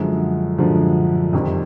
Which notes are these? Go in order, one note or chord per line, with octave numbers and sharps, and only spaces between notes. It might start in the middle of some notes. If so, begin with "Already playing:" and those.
Already playing: F#2 D3 F3 G#3
F#2 D3 F3 G#3
F2 C3 D#3 G3 C4